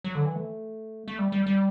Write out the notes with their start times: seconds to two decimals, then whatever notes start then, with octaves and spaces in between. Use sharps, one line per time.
0.04 F#3
0.15 D3
0.25 E3
0.36 A3
1.08 A3
1.19 G3
1.32 G3
1.47 G3